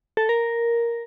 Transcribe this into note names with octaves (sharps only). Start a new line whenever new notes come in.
A4
A#4